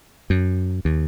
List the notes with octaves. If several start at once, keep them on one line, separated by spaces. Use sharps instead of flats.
F#2
D#2